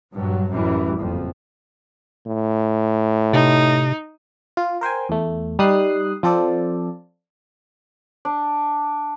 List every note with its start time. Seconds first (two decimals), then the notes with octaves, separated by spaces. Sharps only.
0.13 A#1 G2 F#3
0.51 A1 F#2 E3 G3
1.00 F#1 F2
2.27 A2
3.33 C3 D#4
4.57 F4
4.81 A#4 C5 G5 G#5
5.09 E2 A3
5.59 G3 D#4 D#6 F#6 C7
6.23 F3 C4 F4 A4 C5 D5
8.25 D4